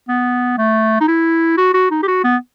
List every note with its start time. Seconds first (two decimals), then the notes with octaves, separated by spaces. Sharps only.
0.09 B3
0.58 A3
1.01 D#4
1.08 E4
1.58 F#4
1.74 F#4
1.91 D#4
2.03 G4
2.08 F#4
2.24 B3